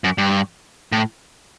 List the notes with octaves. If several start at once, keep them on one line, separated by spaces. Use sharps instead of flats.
F#2
G2
A2